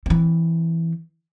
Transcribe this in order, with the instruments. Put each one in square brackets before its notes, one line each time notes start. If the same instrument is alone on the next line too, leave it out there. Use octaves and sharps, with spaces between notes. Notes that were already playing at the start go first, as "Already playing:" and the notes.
[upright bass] E3 C4